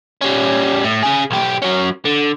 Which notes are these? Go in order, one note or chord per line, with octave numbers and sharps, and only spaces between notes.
G3 C#4
A2
C#3 G#4
B1 G4
F#3 C#4
D3